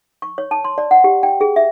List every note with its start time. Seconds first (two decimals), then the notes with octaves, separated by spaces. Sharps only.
0.22 C#6
0.38 C#5
0.51 A5
0.64 C6
0.78 D5
0.91 F#5
1.04 G4
1.23 G5
1.41 G#4
1.56 E5